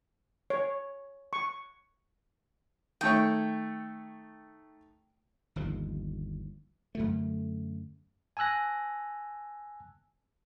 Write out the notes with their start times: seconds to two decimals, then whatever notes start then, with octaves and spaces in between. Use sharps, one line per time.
0.50 C#5
1.33 C#6
3.01 D#3 A3 C#5 G5
5.56 G1 D#2 F3
6.95 F#2 D3 A3
8.37 G#5 A5 E6 F#6 A#6